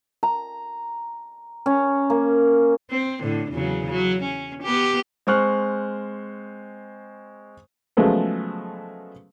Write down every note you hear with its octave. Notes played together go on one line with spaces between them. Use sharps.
A#5
C#4
A#3
C4
A2 D3
E2 C#3 F#3
F#3
C#4
B3 G4
G#3 C4 C5 C#6 F6 F#6
C#3 F3 F#3 G#3 A3 B3